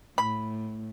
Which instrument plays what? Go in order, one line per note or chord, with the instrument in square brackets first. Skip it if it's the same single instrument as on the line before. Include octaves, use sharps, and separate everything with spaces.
[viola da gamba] A2 [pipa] B5